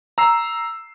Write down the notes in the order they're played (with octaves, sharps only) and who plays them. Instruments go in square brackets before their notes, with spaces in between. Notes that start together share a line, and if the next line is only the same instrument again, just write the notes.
[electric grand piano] A#5 E6 C7